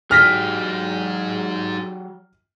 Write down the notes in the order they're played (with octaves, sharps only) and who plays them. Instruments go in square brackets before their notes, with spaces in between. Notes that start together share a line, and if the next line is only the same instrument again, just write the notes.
[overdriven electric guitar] F#3 G4 [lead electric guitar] D#4 G#4 [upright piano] F6 A#6 B6